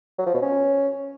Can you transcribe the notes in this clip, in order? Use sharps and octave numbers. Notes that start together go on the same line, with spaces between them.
F#3
F3
B2
C#4